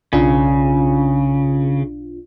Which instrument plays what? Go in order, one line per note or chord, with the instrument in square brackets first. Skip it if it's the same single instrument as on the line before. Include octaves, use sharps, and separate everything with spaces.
[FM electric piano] B1 D4 F4 [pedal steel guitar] C#3